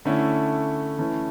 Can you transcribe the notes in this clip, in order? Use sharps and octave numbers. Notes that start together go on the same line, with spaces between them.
D3 A3 C#4 E4
E3 A3 C#4 E4